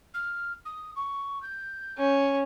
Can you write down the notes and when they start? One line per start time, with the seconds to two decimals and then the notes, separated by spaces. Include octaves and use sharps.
0.14 F6
0.65 D#6
0.96 C#6
1.42 G6
1.97 C#4